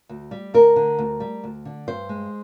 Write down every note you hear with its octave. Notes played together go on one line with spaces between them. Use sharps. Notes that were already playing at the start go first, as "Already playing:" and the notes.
D2
G3
D2 A#4
D3
D2
G3
D2
D3
G2 C5
G#3